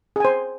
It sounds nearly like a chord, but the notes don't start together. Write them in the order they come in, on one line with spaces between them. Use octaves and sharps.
G#4 G#5 C5